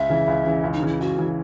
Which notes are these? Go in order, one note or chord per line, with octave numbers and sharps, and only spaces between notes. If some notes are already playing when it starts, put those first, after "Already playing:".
Already playing: C#2 E5
C#3 E3
C#2
C#3 E3
C#2
D#4
C#3 E3 E4
C#2 F#4
C#3 E3